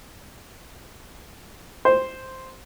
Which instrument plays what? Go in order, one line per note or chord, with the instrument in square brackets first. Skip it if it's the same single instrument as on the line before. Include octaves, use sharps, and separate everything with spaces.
[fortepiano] C5